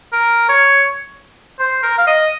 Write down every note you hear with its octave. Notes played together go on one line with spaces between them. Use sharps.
A#4
C#5
C5
A#4
F5
D#5